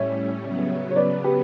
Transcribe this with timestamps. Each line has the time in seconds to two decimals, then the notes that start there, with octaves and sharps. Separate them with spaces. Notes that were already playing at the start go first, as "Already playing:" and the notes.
Already playing: A2 G3 C#4 C#5 E5
0.42 C#3 F#3 B3
0.90 C#5
0.96 B4 D5
1.24 G4 B4